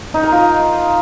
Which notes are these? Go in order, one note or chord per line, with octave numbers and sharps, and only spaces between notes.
D#4
A#4
F4